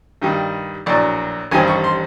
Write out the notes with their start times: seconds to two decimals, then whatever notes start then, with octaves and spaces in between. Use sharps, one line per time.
0.22 G2 D#3 G3
0.86 A#1 A2 F#3 D5
1.51 A1 G2 D#3 G3 C4 G#5
1.68 C#6
1.84 C6